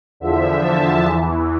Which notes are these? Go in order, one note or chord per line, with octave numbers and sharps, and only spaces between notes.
E2 D3 F3 E5
A5
E2 E3